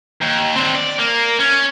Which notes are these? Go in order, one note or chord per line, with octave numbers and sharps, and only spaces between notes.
D#2
C4 D4
D5
A#3
C#4